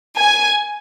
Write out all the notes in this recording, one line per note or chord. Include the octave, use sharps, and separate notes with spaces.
G#5